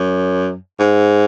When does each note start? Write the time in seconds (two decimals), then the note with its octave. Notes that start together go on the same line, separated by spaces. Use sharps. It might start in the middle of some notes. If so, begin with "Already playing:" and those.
Already playing: F#2
0.80 G#2